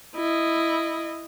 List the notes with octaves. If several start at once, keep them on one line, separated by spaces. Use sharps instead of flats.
E4 D#5